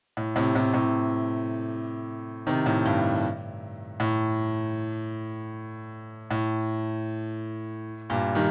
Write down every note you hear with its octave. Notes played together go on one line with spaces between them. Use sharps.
A2
A2 C3
A2 C3
A2 C3
C3 D#3
A2
G2
A2
A2
G2 A#2
D#3 G3